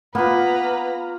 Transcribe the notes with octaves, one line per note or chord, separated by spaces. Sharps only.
A#3 B3 F4 B4 A#5